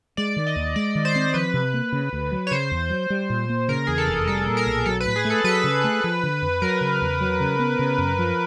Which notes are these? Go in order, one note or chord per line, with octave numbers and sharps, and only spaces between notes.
G#3 D5
D#3
D#5
D#2
G#3 D5
D#3
C5
C4
F3 B4
C3
A#3
C#3
D2
F#3
C#5
C#3 C5
E2
F#3
G3
A#2
A#3
C#3 A#4
E2 G#4
A4
F1
G3 A4
A#2
A#4
B1
F#3 A4
B4
A2
G#4
A3
A4
F#3 B4
C#3
A3
F3
D3
F2
F#3 A#4
C#3
E2
F#3
C#3
B3
C#3
F#2
F3